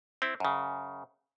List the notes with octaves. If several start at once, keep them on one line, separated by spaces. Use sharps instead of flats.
C4 E4
F#2 C#3